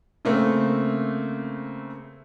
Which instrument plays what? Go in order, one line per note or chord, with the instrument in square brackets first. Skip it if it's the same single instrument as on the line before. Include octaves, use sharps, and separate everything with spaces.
[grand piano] C#3 A3 A#3 C4